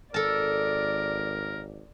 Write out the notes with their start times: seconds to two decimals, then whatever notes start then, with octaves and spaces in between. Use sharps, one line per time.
0.14 G#1 A4 A#4 D5 A5